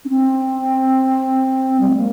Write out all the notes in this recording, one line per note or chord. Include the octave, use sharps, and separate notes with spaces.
C#4
C4
G3
G#3
A#3